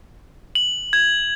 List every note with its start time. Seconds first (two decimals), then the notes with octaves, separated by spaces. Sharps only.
0.55 F#7
0.93 G#6